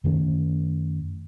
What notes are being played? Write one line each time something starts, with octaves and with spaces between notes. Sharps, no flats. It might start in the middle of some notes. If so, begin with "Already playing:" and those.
F#2 D#3 A3 C#4